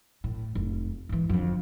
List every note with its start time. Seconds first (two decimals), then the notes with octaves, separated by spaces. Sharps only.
0.24 A2
0.55 F1
1.09 G#2 E3
1.29 F2 D3